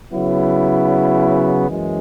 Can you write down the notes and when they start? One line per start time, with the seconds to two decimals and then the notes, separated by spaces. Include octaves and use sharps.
0.12 C#3 F#3 B3 E4
1.69 F#2 E3 G#3